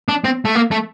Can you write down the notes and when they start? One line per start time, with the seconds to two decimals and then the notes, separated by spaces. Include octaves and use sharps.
0.08 D4
0.24 C4
0.45 A3
0.55 A#3
0.71 A3